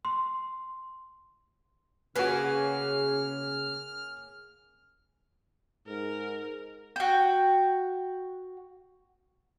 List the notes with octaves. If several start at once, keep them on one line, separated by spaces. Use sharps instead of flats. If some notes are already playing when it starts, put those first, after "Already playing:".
C6
C#3 A#3 C#4 F#4 G#4 B4 F6
G#2 A#4
F#4 G5